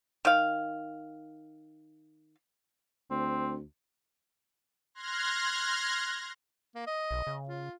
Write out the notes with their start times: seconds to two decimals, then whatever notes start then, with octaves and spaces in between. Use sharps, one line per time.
0.25 D#3 F5
3.10 D2 C4
4.95 C6 F6 F#6 G#6 A#6
6.75 A#3
6.87 D#5
7.11 B1
7.27 C#3
7.49 F4